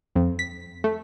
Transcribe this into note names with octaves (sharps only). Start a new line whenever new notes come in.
F2
B6
A3